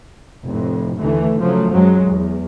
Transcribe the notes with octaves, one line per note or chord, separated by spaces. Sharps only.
F1 F2 A2
D#2 D3 E3 A3
C#3 F3 F#3 A3
F#2 F#3 G#3
E2